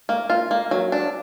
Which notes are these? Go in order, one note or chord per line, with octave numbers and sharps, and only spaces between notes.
A#3
F4
A#3
F#3
D4